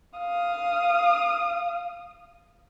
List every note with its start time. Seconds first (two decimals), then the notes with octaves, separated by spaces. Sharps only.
0.19 F5 D#6